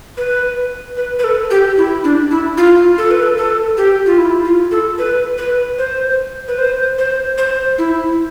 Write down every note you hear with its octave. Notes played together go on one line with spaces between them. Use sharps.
B4
B4
B4
A4
G4
E4
D4
E4
F4
A4
B4
A4
A4
G4
F4
E4
F4
A4
B4
B4
C5
B4
C5
C5
C5
E4